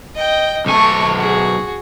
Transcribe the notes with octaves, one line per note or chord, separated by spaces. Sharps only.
D#5 G5
B1 A3 G#5 C#6
F#4 G#4